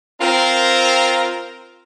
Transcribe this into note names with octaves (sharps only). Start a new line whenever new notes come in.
C4 F4 A#4